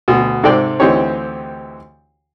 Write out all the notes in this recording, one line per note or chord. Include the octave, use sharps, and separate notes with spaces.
D2 B2
G#2 C3 A4 D5 G5 C6
D2 E3 C4 D#4 G4 C#5